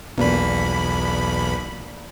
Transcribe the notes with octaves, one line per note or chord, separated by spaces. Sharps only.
B1 E2 F3 A#3 D4 B5